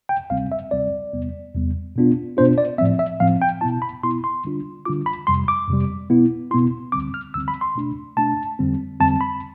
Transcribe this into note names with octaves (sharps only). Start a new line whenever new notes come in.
G5
D2 C3 G3 C4 F5
E5
D2 C3 G3 C4 D5
E2 C3 G3 B3
E2 C3 G3 B3
B2 B3 D4 F4
B2 B3 D4 F4 C5
D5
A2 F3 C4 E5
E5
A2 F3 C4 F5
G5
B2 B3 E4 A5
B5
B2 B3 E4 C6
C6
D3 G3 D4 F4
D3 G3 D4 F4 D6
B5
F2 C3 G3 C6
D6
F2 C3 G3
B2 B3 E4
B2 B3 E4 C6
D2 D3 G3 C4 D6
F6
D2 D3 G3 C4 E6
B5
C6
B2 A3 D4
B2 A3 D4 A5
F2 D3 G3 C4
F2 D3 G3 C4 A5
B5